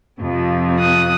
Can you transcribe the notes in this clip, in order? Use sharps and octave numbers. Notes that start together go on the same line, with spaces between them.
F2 C3 F3 C4
D#6 F#6